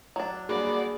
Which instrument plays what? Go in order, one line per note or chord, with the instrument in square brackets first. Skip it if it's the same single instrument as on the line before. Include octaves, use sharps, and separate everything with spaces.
[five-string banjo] F#3 D4
[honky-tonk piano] G2 A#3 F#4 [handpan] G#4 [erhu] D5